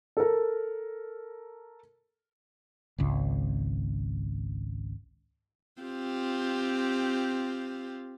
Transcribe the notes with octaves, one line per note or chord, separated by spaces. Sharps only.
A4 A#4
G#1 C#2
C4 F4 G4